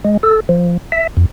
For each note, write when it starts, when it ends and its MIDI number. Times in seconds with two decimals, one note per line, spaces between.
0.05 0.17 56
0.23 0.40 69
0.49 0.77 53
0.92 1.07 76
1.17 1.25 41